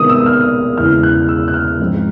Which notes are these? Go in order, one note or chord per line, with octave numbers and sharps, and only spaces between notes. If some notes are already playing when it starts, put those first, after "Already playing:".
Already playing: C3 D#3 G#3 B3 D#6
E6
F6
E2 C#3 E3 G#3 F6
F#6
E6
F#6
F6
G#2 F3 G#3 C4 D#4